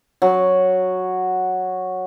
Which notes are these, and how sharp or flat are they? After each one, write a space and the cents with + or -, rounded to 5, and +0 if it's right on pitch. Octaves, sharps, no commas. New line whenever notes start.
F#3 -5